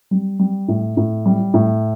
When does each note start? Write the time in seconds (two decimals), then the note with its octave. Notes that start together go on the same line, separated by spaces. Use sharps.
0.11 G3
0.39 G3
0.68 A2
0.97 A2
1.26 G3
1.54 A2